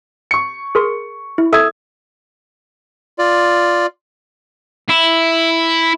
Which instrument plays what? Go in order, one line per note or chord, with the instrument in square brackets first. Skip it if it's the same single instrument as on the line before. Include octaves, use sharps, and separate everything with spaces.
[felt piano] C#6 C#7
[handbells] G#4 A#4 C6
E4
[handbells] A4 E5 [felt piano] D#6 E6 G#6
[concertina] F4 D5
[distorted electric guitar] E4